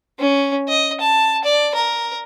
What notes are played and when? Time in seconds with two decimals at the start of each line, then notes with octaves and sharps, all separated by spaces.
0.19 C#4
0.68 D#5
1.00 A5
1.44 D5
1.75 A#4